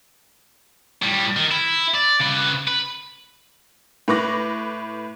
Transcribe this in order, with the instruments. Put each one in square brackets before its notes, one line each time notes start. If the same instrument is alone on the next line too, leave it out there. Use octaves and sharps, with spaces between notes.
[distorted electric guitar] A2 G3
D#3
E4
D5
C#3 B4
B4
[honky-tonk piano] A2 B4 C#6 D6 A#6 F#7